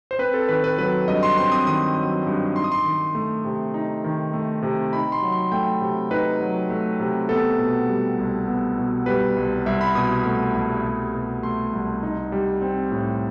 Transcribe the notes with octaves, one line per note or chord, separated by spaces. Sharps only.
C5
C4 B4
A4
D#3 B4
B4
F#3 B4
G2 D#5
C6
C4 C6
D#6
D#3 D#6
F#3
G2
D#4 C6
D#6
C6
D#3
A3
C3
D#4
D#3
A3
C3
D#4 B5
C6
F#3
C6
A3 G5
C3
D#4 B4
F#3
A3
C3
B3 A4
B2
G3
C2
B3
B2
G3 B4
C2
C2 E5
B5
B2 D#6
A3
C2
C2
B2
A3 C6
C2
D#4
G3
C4
A2